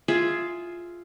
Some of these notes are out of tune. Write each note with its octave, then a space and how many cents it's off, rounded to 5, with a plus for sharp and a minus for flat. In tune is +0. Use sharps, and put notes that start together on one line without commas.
F4 -5 G#4 +5 E5 +0